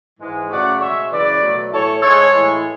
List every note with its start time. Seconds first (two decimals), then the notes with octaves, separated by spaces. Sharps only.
0.20 G#2 E3 G#3
0.50 F#2 C#3 F#3 A3 D5 F#5
0.81 B2 G#3 C#5 E5
1.11 F#2 C#3 E3 B4 D5
1.42 B2 F#3 A3
1.71 A2 E3 A3 A4 C#5
2.02 G#2 G#3 A4 C#5
2.33 A2 E3 G#3